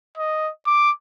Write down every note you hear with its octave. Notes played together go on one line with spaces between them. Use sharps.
D#5
D6